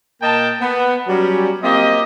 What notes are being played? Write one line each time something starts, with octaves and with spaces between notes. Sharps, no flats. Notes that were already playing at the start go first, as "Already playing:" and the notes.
A#2 A#3 D#5 G5 A5
B3
F#3 G3 C#4
A#3 C4 F4 G4 D#5